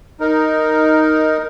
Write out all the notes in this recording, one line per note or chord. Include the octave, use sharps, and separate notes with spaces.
D#4 A#4